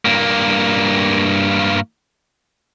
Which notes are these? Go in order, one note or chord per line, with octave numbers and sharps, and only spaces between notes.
G2 A#3